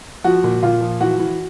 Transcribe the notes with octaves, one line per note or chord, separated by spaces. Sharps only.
F3 F#4
A#2
A#2 F4
F3
E3 F#4
E3